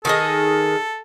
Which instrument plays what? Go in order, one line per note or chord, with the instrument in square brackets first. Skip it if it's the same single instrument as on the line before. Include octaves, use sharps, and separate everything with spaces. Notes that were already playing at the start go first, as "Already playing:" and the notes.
[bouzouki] D#3 G#4 D#5 [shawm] A4